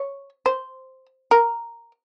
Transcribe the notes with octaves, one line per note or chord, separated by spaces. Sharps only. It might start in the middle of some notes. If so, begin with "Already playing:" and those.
Already playing: C#5
C5
A#4